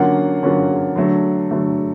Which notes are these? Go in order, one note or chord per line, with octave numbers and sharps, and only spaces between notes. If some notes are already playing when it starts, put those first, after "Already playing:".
Already playing: D3 F#3 A#3 C#4 F4 F#5
D3 F#3 A#3 C#4 F4
D3 F#3 A3
D3 F#3 A3